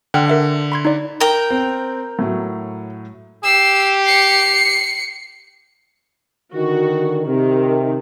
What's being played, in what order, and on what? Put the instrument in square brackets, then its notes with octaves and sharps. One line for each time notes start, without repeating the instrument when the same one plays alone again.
[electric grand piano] D3 [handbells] F#5 G5 F6
[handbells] A#4 E5 F#5
B5 C6 G#6
D#4 D5
[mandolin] A#4 G5
[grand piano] C4
A2 F#3
[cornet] G4 [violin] E6 C7
[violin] C7 C#7
[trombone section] D3 D#3 [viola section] F#4
[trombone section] C3 [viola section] D#3